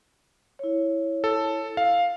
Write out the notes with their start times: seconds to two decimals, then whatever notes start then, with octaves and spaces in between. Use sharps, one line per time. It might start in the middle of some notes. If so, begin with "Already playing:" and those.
0.59 E4 C#5
1.24 A4
1.77 F5